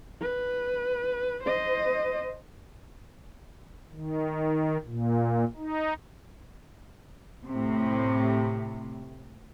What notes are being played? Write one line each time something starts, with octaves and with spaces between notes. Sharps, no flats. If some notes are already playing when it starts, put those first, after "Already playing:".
B4
C5 D#5
D#3
A#2
D#4
A2 C3